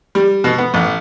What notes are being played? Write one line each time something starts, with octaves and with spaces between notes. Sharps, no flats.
G3
B2
B3
A1